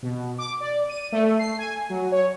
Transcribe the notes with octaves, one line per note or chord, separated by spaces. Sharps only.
B2
D6
D5
D#7
A3
C7
G#5
F#3
C#5